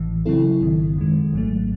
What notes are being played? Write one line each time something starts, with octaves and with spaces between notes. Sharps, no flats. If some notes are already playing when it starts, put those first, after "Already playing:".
Already playing: A1 A2 E3
C#3 F#3 C4 E4 A4
A1 G#2 D#3
F#2 D#3 G#3
G#1 G#2 F#3 A3